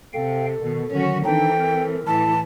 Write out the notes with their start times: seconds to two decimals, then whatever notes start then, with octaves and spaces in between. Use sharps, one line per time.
0.14 C3 A4 F5 G5
0.62 B2 D#3
0.92 D3 D#3 F#3 C#4 F#4
1.25 D#3 E3 C4 D4 D#4 A4 G5
1.60 A#4
2.07 A2 E3 E4 A4 A5